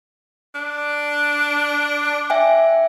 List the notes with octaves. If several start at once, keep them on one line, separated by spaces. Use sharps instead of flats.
D4
E5 G5 G#5